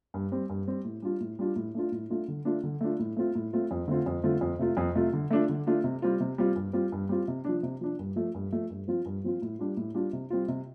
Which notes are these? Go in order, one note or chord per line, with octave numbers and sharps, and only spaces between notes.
G2
G3 C4
G2
G3 C4
A2
G3 D4 F4
A2
G3 D4 F4
A2
A3 D4 F4
A2
A3 D4 F4
D3
A3 D4 F4
D3
A3 D4 F4
A2
A3 C4 F4
A2
A3 C4 F4
F2
D3 A3 C4 F4
F2
D3 A3 C4 F4
F2
C3 A3 F4
F2
C3 A3 F4
D3
A3 D4 F4
D3
A3 D4 F4
C3
G3 C4 F4
C3
G3 C4 F4
G2
G3 C4 F4
G2
G3 C4 F4
C3
F3 D4
C3
F3 D4
G2
F3 A3
G2
F3 A3
G2
F3 C4 F4
G2
F3 C4 F4
A2
G3 D4 F4
A2
G3 D4 F4
C3
G3 C4 F4
C3